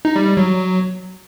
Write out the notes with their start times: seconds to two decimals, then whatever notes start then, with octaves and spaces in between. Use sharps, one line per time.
0.05 D#4
0.16 G3
0.26 G3
0.37 F#3